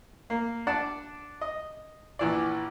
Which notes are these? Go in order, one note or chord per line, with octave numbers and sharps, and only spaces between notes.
A#3
D4 D5 F#5 A5
D#5
A#1 E3 D5